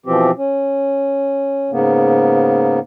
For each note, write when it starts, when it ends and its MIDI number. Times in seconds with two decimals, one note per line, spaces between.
0.06 0.31 47
0.06 0.31 52
0.06 0.31 53
0.06 0.31 60
0.06 0.31 67
0.37 1.71 61
1.71 2.79 44
1.71 2.79 49
1.71 2.79 58
1.71 2.79 59